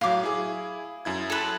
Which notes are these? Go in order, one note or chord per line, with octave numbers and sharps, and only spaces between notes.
A2 F#3 F5 D6
E4 G#4
F#2 E4 G#6
A4 B4